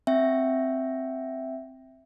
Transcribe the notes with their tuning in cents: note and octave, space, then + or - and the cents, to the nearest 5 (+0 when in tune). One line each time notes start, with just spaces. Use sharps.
C4 +0 E5 +0 G5 +0